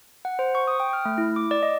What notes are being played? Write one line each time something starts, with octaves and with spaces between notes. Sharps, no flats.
F#5
C5
C#6
D#6
G5
F6
A3
E4
D6
D5
D#5